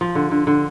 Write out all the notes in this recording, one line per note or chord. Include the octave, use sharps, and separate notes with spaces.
F3
D3
D3
D3